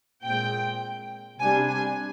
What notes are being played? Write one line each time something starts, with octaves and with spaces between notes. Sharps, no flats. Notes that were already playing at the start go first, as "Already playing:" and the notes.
A#2 G#3 C4 G5
C3 G3 D4 G#5
G#5